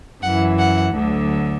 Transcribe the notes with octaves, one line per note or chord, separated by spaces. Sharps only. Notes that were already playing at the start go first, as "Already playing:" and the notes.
F#2 E3 F#5
F#5
D2 D3 F#3